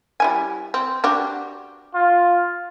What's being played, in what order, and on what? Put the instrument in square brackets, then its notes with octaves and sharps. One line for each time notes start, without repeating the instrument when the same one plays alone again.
[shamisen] G3 E4 G#5
C4
D4 F#4 G4
[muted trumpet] F4